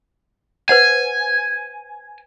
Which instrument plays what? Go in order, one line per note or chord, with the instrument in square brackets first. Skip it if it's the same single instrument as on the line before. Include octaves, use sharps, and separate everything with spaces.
[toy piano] B4 C5 F#5 [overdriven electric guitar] G#5